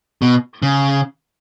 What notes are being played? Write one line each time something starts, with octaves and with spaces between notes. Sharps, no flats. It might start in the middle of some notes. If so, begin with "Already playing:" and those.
B2
C#3